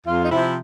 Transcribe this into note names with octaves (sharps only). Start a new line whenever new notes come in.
F2 F4
D#4
C3 F3 E4